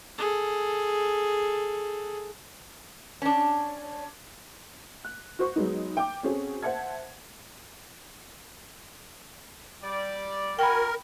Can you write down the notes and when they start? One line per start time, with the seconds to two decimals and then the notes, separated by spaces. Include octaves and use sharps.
0.18 G#4 A4
3.22 C#4 D4
5.05 F#6
5.39 F#4 C5 C#6
5.56 F#3 G#3 B3 D#4
5.97 G5 D6
6.23 C4 C#4 F#4 G#4 A4
6.62 C5 E5 F#5 A5 G#6
9.83 G3 D5
10.59 F#4 A#4 G5 G#5 B5